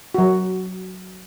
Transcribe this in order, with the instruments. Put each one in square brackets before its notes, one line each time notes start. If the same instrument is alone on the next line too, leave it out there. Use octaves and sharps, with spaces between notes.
[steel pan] F#3 F#4